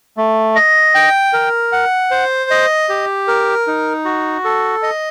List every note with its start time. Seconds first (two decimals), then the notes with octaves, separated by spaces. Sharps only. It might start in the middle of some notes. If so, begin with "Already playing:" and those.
0.17 A3
0.55 D#5
0.95 G5
1.33 A#4
1.72 F#5
2.11 C5
2.50 D#5
2.89 G4
3.28 A#4
3.67 D#4
4.05 F#4
4.44 A4
4.83 D#5